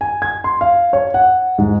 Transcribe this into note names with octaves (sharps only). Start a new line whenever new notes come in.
G#5
G#6
C6
F5
C#5
F#5
G#2